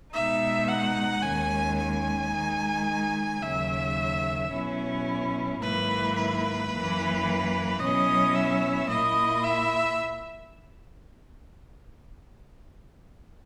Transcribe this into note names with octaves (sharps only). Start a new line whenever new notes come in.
B2 G#3 D#4 E5
F#5
D#2 D#3 G#3 C#4 G#5
G#5
D#3 G#3 D#4
D#2 C#3 F#3 E5
B2 F#3 C#4 E4
G#2 D#3 F#3 A#3 E4 B4
B4
F#2 E3 A#3
B2 F#3 C#4 E4 D#5
E5
A#2 A#3 E4 D#5
E5